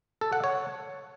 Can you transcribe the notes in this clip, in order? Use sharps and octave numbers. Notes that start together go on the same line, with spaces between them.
A4
F#5
C#5